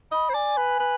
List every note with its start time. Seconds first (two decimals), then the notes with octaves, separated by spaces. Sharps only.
0.12 D#5 B5
0.30 C5
0.34 D5 G#5
0.57 B4
0.80 B4